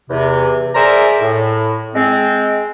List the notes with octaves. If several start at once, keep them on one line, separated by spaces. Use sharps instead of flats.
E2 C3
G#4 A#4 C5 D5 E5 A#5
A2
G#3 C4